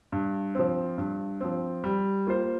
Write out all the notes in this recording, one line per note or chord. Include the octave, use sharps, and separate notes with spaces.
G2
F3 C4
G2
F3 C4
G3
A#3 F4 C5